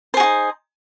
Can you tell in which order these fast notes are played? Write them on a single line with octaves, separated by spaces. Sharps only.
C5 G#4 F#4 D#4